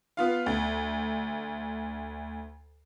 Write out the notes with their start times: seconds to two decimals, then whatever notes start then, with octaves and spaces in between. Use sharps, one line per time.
0.17 B3 F4 F5
0.46 D2